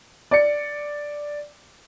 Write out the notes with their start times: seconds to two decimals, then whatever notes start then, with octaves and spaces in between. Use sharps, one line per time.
0.31 D5 C#7